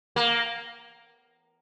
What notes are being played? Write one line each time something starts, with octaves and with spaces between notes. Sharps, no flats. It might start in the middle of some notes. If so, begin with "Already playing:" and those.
A#3